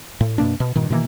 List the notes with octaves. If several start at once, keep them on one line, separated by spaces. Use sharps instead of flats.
A2
F#2 B2 A#3 D4
B2
G2 A#2 D#3
B2 D#3 E3 A#3